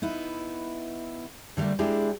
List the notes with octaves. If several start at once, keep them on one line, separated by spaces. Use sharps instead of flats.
B3 D#4 E4
D3 G3 A3 A#3
G#3 D4 E4 G4 G#4